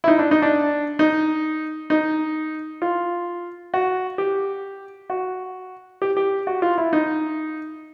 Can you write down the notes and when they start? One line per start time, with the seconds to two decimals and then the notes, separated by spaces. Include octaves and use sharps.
0.04 E4
0.08 D#4
0.19 D4
0.31 D#4
0.42 D4
0.99 D#4
1.90 D#4
2.82 F4
3.74 F#4
4.18 G4
5.10 F#4
6.02 G4
6.17 G4
6.47 F#4
6.62 F4
6.78 E4
6.93 D#4